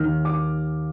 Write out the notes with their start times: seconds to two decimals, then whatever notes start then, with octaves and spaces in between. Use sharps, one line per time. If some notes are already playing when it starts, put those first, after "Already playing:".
Already playing: D#2 D#3 F6
0.25 D6